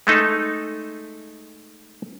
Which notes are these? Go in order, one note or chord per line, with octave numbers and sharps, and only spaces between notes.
G#3 A3 D#4 A4